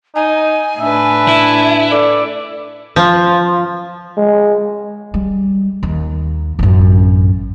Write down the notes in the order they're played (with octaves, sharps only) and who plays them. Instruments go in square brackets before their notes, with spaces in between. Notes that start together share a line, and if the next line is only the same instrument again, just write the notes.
[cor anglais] D#4 [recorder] G#5
[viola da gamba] A2 D4 B4 [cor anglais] E5
[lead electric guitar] E4
[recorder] A4 [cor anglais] D5
[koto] F3
[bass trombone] G#3
[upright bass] G3
D#2
A1 F#2